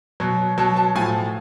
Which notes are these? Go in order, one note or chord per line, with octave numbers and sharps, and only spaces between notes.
B2 F#3
B2 F#3 A5
A5
A2 F3 G#5